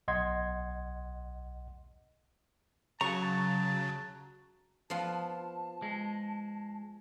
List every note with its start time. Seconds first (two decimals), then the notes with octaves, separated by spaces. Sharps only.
0.08 B1 D#5 F#5 C6 G#6
3.01 C#3 F#3 F#4 A5 A#5 C#6
4.90 F3 B3 F4 A5
5.82 G#3